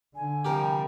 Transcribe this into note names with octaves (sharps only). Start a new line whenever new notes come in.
D3 G#5
C3 F3 G3 G4 A#4